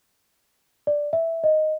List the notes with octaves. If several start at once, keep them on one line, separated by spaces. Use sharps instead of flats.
D5
E5
D#5